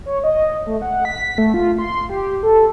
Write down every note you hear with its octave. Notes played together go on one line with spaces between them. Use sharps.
C#5
D#5
A3
F#5
B6
A3
F4
C6
G4
A4